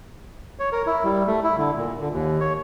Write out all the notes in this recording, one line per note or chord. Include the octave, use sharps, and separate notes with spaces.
C#5
A#4
E4
G3
A3
E4
D3
A#2
D3
D#2
C#5